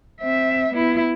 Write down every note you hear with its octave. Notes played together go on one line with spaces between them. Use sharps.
C4 E5
B3 E4